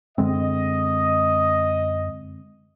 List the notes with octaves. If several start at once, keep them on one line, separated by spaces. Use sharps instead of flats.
F#2 D3 G#3 C4 D#5